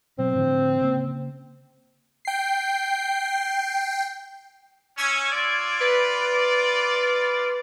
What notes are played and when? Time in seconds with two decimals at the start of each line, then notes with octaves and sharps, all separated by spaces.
0.18 B2 F#3 C4
0.35 A2 D3 F3
0.81 C#3 A#3
2.25 G5 C7
4.97 C#4 E6 G#6
5.32 F4 D5
5.80 B4